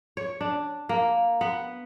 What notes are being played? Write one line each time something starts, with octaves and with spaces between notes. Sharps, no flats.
C#5
D4
A#3
B3